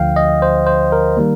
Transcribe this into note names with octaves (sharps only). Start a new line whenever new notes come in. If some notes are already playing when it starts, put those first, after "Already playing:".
Already playing: D2 D3 F3 F5 G5
D#5
C5
C5
A#4
D#3 G3 A#3